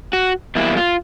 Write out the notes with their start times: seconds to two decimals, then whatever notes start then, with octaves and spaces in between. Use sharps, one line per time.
0.13 F#4
0.55 E2 B2 G3 A#3 E4
0.77 F4